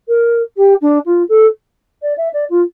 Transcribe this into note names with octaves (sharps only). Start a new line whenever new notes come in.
A#4
G4
D4
F4
A4
D5
E5
D5
F4